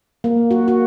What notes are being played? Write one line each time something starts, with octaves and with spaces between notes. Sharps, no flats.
A#3
F#4
F#4